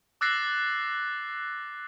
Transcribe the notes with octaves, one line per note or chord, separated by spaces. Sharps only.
D6 E6 F#6 A6 A#6 C7